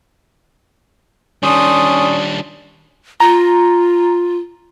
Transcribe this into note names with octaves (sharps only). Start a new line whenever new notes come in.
D#3 G3 C#4 D4 C6 D#6
F4 A#5